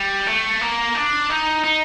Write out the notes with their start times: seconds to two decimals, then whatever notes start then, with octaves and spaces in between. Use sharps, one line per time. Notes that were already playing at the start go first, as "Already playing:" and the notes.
Already playing: G3
0.27 A3
0.61 A#3
0.95 D4
1.30 D#4
1.64 D#4